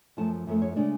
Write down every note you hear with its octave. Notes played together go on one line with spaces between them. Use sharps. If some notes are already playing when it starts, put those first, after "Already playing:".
F#2 F3 A3 A5
F#2 F3 A3
C#5
C#3 G#3 D4 D5